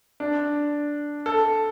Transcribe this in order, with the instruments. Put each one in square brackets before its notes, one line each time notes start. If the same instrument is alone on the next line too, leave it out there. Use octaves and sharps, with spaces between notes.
[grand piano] D4
A4